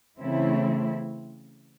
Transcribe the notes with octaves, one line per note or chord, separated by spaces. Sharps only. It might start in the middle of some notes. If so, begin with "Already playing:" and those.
C#3 E3 A3 C4 E4